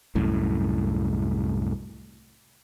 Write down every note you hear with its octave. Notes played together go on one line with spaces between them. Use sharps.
C2 F#2 A2